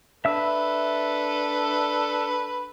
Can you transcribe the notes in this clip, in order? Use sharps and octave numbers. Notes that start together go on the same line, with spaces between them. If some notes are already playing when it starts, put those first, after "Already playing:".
D4 A4 B4 E5 E6